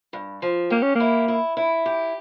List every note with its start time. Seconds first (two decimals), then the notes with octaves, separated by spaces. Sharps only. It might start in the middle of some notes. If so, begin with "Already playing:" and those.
0.13 G2
0.42 F3
0.70 A#3 G4
0.83 C#4
0.95 A#3 E4
1.28 E4
1.57 E4
1.86 G4